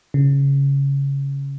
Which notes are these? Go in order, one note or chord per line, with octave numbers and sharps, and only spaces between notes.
C#3